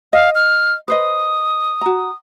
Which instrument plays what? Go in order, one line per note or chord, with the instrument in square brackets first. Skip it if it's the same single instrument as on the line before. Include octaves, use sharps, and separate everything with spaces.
[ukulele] D#5 [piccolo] F5
[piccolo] F6
[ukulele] B4 C5 D#5 [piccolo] D#6
[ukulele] F#4 A#5